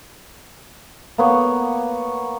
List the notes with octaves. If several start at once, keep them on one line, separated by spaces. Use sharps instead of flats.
A#3 B3 C#5